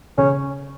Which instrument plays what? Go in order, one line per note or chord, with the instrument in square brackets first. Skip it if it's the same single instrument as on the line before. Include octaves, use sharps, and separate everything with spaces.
[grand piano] C#3 [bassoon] C#4